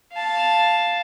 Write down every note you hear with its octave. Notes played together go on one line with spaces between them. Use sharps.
F5 A5